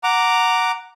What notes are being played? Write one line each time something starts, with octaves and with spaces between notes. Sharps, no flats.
F#5 A#5 D6